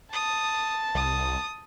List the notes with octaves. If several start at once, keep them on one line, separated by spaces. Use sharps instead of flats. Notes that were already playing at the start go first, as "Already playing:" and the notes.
A5 D#6
C2 D#6